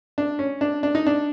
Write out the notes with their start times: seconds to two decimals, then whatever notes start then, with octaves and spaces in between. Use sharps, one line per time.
0.18 D4
0.39 C#4
0.61 D4
0.83 D4
0.95 D#4
1.06 D4